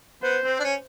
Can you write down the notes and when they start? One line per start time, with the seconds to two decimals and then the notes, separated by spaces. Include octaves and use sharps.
0.23 B3 C5
0.44 C4
0.59 D4
0.64 C#4